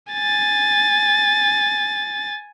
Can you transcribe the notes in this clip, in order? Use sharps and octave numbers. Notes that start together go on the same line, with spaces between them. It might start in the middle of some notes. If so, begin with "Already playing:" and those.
G#5 A6